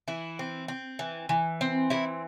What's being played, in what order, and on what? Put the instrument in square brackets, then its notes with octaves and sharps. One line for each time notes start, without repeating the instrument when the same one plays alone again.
[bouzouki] E3 E4
C4
C4
E3
E3
C4
E3 E4